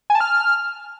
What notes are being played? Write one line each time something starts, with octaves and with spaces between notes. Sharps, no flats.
G#5
A5
F6